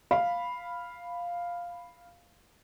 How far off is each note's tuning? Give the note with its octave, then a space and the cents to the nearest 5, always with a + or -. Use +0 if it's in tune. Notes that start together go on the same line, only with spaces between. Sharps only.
F5 +0 B5 +0